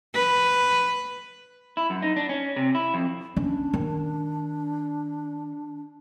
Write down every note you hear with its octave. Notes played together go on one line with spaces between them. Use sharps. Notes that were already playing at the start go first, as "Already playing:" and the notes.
B4
E4
F#2
D#4
D4
C#4
C3
E4
F2
C#4 D4
D#3